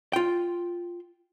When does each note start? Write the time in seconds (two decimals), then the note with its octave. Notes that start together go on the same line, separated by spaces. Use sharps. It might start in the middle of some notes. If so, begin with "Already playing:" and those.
0.13 F4 G5